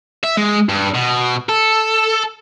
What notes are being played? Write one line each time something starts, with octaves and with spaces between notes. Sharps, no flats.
E5
G#3
G2
B2
A4